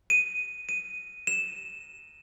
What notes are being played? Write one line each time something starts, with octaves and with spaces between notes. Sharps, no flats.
D#7
D#7
E7